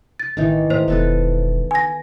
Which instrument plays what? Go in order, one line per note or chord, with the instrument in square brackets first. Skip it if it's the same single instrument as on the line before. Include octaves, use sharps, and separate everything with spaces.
[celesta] A6
[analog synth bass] A1 [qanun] D#3 E3 D#4
[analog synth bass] A2 [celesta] C5 [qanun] A#5
[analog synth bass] E1 [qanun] B3 A4 B4
[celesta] G#5 A#6